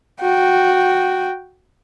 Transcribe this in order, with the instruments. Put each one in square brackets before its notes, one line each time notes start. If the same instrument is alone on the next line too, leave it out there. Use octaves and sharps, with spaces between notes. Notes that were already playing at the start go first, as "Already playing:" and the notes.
[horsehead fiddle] F#4 G5